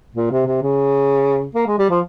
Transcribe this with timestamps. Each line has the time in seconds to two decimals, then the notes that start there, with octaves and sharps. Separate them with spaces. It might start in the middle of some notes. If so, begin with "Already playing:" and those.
0.16 A#2
0.31 C3
0.47 C3
0.63 C#3
1.55 A#3
1.67 G#3
1.78 G3
1.90 F3